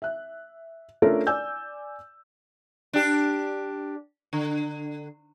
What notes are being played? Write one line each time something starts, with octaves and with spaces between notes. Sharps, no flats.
E5 F#6
A3 C#4 D4 F4 A4 A#4
D5 G#5 E6 G6
D4 G4
D3